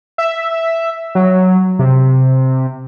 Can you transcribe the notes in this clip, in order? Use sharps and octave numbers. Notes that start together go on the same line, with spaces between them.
E5
F#3
C3